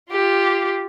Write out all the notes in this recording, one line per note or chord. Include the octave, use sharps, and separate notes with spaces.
F4 G4